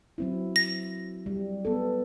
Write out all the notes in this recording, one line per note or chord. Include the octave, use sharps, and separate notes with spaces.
F#3 C4 E4
A#6
G3
B3 A4